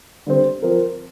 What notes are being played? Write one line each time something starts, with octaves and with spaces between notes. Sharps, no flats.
D3 G3 C4
F3 C4 A#4